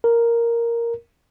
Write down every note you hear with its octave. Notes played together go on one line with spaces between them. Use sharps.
A#4